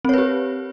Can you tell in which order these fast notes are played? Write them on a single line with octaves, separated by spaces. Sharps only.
C4 C#5 B4 G4